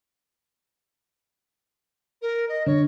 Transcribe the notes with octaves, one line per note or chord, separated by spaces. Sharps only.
A#4
D#5
D3 C#5